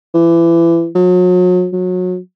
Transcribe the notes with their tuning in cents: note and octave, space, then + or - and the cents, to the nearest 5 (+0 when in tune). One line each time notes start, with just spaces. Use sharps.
E3 +30
F#3 -35
F#3 -25